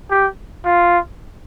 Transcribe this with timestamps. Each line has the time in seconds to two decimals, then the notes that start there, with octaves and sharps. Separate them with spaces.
0.10 G4
0.65 F4